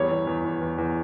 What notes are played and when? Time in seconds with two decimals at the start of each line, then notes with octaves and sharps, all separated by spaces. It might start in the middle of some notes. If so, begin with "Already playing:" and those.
Already playing: E2 G3 C#5
0.11 E2
0.27 E2
0.45 E2
0.62 E2
0.78 E2